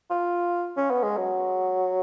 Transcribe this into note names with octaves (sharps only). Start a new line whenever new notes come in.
F4
C#4
B3
G#3
F#3